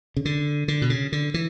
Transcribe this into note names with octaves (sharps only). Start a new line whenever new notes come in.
C#3
D3
D3
B2
C#3
D3
E3